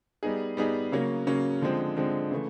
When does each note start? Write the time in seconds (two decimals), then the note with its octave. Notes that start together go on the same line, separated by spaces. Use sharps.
0.23 G3 B3 D#4 G#4
0.57 G3 B3 D#4 G#4
0.92 C#3 F#3 A#3 C#4
1.27 C#3 F#3 A#3 C#4
1.62 D3 F3 G#3 C4
1.97 D3 F3 G#3 C4
2.31 C#3 E3 A3